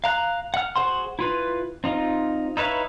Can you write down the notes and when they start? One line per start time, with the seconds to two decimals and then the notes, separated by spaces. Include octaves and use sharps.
0.04 F5 A#5 F#6
0.54 F#5 F6
0.76 F#4 G#4 C5 F#5 C6
1.19 E4 F4 B4
1.84 C4 D#4 F4
2.57 D#4 E4 B4 C#5 F5